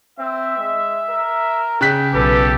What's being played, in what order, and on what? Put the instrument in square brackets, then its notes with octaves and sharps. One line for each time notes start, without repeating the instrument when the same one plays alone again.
[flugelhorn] C4 [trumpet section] E5
[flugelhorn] G#3
A#4
[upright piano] C#3 F#6 B6 [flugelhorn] G5
[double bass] B1 [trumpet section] G4 A4 [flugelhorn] B4